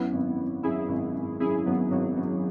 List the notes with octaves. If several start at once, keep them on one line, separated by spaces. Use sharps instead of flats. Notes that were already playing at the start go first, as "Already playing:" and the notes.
Already playing: F#2 B3 E4
G#1
F#2
F#2 E4 G#4
G#1
G#1
F#2 E4 G#4
G#1 F#3 B3
G#1 F#3
F#2 F#3